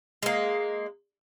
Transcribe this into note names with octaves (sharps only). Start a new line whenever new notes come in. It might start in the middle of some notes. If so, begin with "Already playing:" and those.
G#3 A#3